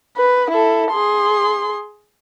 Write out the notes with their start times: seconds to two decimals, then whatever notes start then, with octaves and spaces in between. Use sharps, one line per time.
0.17 B4
0.50 E4 A4
0.92 G#4 C6